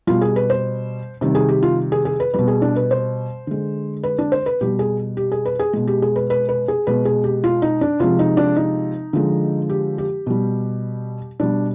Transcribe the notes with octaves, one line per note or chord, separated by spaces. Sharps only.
B2 G3 F4
G#4
B4
C5
C3 D#3 G3
G#4
G4
F4
G#4
G#4
B4
B2 G3 B4
G#4
D4
B4
C5
D3 G#3
B4
D4
C5
B4
B2 G3 G4
G#4
G4
G#4
B4
G#4
B2 G#3
G4
G#4
B4
B4
B4
G#4
B2 G#3 B4
G#4
G4
F4
D#4
D4
C3 F3 G#3 F4
D#4
D4
D#4
D3 F3 G#3
G4
G4
B2 G3
B2 G3 D4